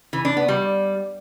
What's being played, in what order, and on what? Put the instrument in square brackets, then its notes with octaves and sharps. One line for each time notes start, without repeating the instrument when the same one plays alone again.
[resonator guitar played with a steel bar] E3
D4
B3
G3